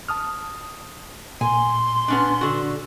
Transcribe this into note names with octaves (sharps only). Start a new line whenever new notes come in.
A5 D#6 F6
A#2 G#5 C6
B3 C#4 D4
D3 F#4